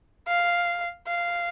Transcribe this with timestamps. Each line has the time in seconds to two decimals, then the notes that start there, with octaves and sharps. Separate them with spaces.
0.27 F5
1.07 F5